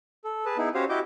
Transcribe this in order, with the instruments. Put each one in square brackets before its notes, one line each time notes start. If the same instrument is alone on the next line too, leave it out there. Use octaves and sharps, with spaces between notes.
[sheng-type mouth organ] A4
G#4 B4 A5
B3 D#4 E4 G#4
C#4 F#4 G4 C5 C#5 F5
E4 F#4 G4 D#5 D6 G6